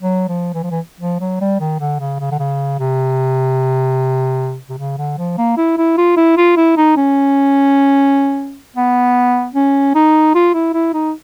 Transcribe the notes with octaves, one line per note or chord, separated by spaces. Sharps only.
F#3
F3
E3
F3
E3
F3
F#3
G3
D#3
D3
C#3
C#3
D3
C#3
C3
C3
C#3
D3
F3
A#3
E4
E4
F4
E4
F4
E4
D#4
C#4
B3
C#4
D#4
F4
E4
E4
D#4